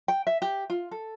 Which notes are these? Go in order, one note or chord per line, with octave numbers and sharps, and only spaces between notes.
G5
E5
G4
F4
A4